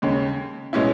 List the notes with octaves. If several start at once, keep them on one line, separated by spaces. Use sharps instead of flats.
D#2 C#3 G#3
B2 G#3 C#4 E4